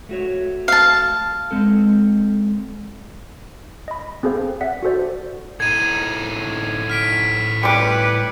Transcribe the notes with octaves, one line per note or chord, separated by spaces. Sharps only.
A3 F#4 C#5
F5 A5
G#3 C4 A4
D#5 B5
C4 G#4 A4 C5 F5
D5 E5 F#5 B6
F#4 G4 A4 C5 D5
A2 D#4 G#6 D#7
F6 B6 D7
G3 B4 D6 C#7